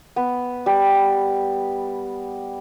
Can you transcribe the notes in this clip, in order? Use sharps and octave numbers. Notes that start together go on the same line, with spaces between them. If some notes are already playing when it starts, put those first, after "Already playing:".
B3
G3